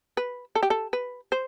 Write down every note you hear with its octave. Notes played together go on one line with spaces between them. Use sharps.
B4
A4
G4
A4
B4
C5